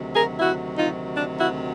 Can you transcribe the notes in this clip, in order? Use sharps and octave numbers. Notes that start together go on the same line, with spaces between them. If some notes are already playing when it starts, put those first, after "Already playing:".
Already playing: D2 C3 D#3 F#3
G#4 A#4
E4 F#4
D#4 F4
D4
E4 F#4